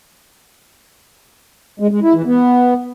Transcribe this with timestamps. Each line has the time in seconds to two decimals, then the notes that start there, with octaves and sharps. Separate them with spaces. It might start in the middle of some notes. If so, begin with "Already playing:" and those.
1.80 G#3
1.91 G#3
2.03 E4
2.14 E3
2.25 B3